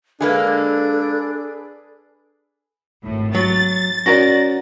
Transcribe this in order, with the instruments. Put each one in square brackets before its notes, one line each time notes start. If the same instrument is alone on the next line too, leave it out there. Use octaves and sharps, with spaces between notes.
[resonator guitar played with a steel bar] D3 G#3 A#3 [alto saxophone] D4 [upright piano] G#4 B4 [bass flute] A4
[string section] G#1 A2
[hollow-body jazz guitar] F#3 [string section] A6
[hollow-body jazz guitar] C#4 F#4 A#4 [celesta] D5 A#6